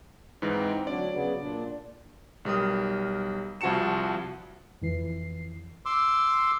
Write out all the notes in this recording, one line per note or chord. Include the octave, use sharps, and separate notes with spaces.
G#2 E3 D#4
C4
D2 F#3 D4 D5
C#3 F#3 B3
A#2 D4
B1 G3 A#4 D#6
C2 F3 F#4 A5 C#7 E7
F2 E3 C7
C6 D6 E6